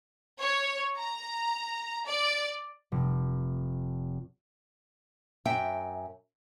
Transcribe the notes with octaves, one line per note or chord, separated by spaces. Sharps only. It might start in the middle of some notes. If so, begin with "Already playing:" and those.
C#5
A#5
D5
F1
F#2 E5 G5